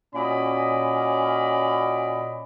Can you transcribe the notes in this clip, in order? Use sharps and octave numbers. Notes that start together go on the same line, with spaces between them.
A#2 C#4 F#4 D5 D#5 B5